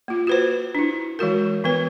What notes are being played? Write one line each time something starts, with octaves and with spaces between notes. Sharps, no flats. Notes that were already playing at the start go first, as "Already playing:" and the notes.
A#3 F4
F#4 B4 C5
D4 E4
E3 G#3 F#4 A#4
E3 B3 B4